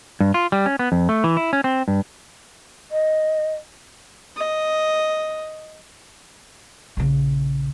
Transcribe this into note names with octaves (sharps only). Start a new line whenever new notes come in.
G2
F4
G3
C#4
B3
F2
A3
E3
E4
C#4
C4
G2
D#5
D#5
A#1 C#3